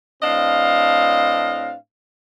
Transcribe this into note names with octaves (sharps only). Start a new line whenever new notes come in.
A2 C4 D4 D#5 F5